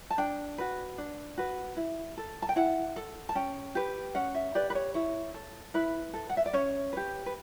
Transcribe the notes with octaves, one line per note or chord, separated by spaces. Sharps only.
A5
D4 G5
F#4 B4
D4
F#4 B4
E4
A4
A5
G5
E4 F#5
A4
A5
C#4 G5
G4 B4
C#4 F#5
E5
G4 B4 D5
B4
C#5
E4 C#5
A4
E4 B4
A4
F#5
E5
D5
C#4 C#5
G4 B4
B4